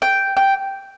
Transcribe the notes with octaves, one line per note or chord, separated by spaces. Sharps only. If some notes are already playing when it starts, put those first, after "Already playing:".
G5
G5